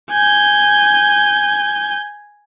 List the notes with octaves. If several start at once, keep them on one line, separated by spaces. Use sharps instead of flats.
G#5 G6